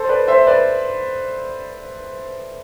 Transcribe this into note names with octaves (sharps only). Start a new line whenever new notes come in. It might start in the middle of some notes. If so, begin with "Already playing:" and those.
Already playing: A4 C5
B4 D5
C5 E5
B4 D5